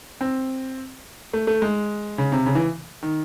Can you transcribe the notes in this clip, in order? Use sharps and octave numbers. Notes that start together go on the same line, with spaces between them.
C4
A3
A3
G#3
C#3
C3
C#3
E3
D#3